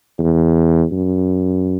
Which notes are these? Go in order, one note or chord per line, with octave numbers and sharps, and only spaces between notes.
E2
F#2